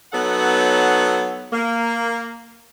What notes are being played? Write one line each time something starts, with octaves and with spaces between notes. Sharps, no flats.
F#3 B3 D#4 A4 C#5 F#5
A#3